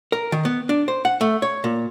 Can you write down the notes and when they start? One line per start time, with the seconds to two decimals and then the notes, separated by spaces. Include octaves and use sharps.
0.12 A#4
0.32 D#3
0.45 B3
0.69 D4
0.88 C5
1.05 F#5
1.21 A3
1.42 C#5
1.64 A#2